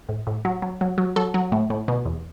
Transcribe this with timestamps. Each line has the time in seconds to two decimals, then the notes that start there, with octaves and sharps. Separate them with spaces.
0.09 A2
0.27 A2
0.45 F#3
0.62 F#3
0.81 F#3
0.98 F#3
1.16 F#3 A4
1.34 F#3
1.52 A2
1.70 A2
1.88 B2
2.06 E2